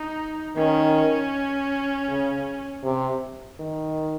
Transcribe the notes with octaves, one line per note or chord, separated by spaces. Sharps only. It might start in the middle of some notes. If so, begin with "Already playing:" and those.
Already playing: D#4
D#3 C#4
C#3
C3
D#3